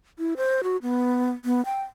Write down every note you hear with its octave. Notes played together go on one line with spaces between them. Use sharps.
E4
C5
F#4
B3
B3
G5